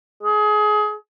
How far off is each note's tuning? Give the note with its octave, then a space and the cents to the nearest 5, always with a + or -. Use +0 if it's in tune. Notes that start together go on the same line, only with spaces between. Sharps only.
G#4 +25